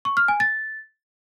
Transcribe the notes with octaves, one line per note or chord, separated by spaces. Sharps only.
C#6
F6
G#5
A6